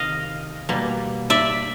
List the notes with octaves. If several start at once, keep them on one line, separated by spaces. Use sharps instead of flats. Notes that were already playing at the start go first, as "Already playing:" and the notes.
Already playing: C3 D#3 D#5 F5
B2 G3 A#3
D5 E5